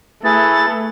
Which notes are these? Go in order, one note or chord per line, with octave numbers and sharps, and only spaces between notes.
A3 E4 G#4 B4 A6